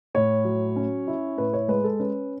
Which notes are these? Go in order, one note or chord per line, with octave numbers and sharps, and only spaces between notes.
A2 C#5
F#3
C#4
E4
A2 B4
C#5
G#3 B4
A4
C#4 B4